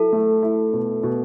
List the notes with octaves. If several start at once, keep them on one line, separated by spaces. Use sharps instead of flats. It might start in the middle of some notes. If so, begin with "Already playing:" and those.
Already playing: F#3 E4 A4
A3
E4
B2
B2